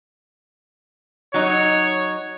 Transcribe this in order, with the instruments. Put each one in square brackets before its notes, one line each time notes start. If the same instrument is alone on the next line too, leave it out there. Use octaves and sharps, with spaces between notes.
[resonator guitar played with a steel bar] F#3 D#4 [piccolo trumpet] C#5